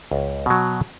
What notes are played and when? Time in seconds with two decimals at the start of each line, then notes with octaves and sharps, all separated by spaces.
0.11 C#2
0.46 B2 F#3